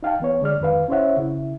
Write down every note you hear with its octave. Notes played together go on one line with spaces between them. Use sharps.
D#4 F5 G5 A5
E3 B3 C#5
D3 G#3 D5 F6
F2 D#3 B4 F5
C#4 E4 C5 C#5 E5 F#5
C#3 E4